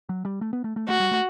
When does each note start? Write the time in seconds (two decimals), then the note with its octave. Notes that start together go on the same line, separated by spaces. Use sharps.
0.09 F#3
0.25 G3
0.41 A3
0.53 B3
0.64 A3
0.76 A3
0.88 A3 F#4
1.00 G3
1.11 A3